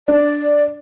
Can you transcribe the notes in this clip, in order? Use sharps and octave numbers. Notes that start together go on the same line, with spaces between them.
D4 D5